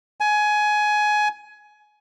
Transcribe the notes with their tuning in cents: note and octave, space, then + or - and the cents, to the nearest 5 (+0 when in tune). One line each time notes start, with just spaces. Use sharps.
G#5 +20